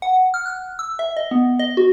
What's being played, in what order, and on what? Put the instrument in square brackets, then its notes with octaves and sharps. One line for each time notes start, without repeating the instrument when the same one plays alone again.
[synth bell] F#5
F6
F#6
E6
E5
D#5
B3
D#5
F#4